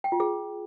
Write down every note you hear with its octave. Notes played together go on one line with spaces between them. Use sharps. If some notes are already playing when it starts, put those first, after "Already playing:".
G5
F4
G#4